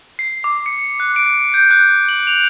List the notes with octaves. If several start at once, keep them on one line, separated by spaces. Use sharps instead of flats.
C7
D6
C#7
F#6
D7
G6
F#6
F#7
F7